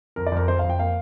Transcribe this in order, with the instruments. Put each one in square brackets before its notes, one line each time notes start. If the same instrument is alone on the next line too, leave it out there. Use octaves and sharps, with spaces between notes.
[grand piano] F2 A#4
D5
F2
A#4
F2 C5
F5
F2
G5
A#3 F5